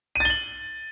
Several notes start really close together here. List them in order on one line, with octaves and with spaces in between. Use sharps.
D#7 A6 G7 F#7